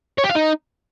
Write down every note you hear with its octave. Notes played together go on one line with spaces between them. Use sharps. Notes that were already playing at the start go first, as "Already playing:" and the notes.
C#5
G4
F5
D#4